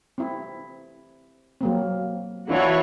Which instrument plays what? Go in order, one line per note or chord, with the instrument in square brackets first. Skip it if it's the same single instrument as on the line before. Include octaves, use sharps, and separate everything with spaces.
[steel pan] C4 E4
F#3 A#3 C4
[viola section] E3 F#4 C#5 [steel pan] C4 D4 F4